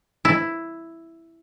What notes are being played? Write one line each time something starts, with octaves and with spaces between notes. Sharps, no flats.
E4